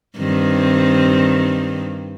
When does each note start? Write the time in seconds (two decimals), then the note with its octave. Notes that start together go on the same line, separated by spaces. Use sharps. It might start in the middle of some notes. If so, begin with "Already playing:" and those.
0.17 G2 D#3 C4